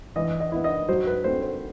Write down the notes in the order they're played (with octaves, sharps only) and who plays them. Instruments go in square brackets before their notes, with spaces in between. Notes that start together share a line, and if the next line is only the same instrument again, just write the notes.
[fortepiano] E3 D#5
D#5
B3 E4
D#5
F#3 C5
B4
A3 C4 C5
C5